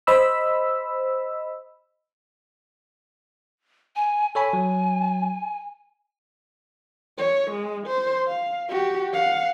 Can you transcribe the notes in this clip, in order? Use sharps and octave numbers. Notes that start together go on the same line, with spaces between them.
C5 D#5 B5 E6
G#5
A4 C#5 G#5 B5
F#3
C#5
G#3
C5
F5
F#4 G4
F5 F#5